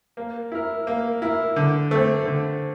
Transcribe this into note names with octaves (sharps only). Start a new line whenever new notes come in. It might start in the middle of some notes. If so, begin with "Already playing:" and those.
A#3
E4 A#4
A#3
E4 A#4
D3
A3 C4
D3